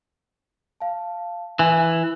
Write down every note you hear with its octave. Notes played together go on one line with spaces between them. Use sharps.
F5 A5
E3 G#5